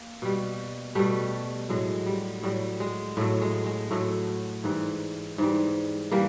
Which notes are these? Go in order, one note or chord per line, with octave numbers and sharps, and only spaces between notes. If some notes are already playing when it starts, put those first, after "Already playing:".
Already playing: A#3
B2 G3
B2 G3 A3
A2 F#3 G#3
G3
A2 F#3 G3
G#3
A2 F#3 A3
G#3
G#3
A2 F#3 A3
G#2 E3 G3
G#2 E3 G3
E3 G3 A#3